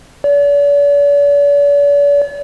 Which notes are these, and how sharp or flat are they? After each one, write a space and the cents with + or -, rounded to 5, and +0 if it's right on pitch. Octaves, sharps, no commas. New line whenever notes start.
D5 -45